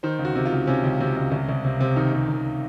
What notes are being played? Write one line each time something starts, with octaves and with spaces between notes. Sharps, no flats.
D#3 C5
C#2
F#4
C3
F4
C#2
C3 C#4
C#2
C3
C#2
C2
C2
C3
C3
D#3 D#4
C3
C2